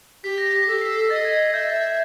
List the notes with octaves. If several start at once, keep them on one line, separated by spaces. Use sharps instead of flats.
G4 B6
A#6
A#6
A4 B6
C7
B6
D#5 A6
G#6
A6
E5 G6
A6
A6